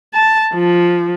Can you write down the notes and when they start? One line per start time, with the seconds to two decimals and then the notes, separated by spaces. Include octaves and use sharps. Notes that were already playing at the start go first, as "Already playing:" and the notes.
0.14 A5
0.54 F3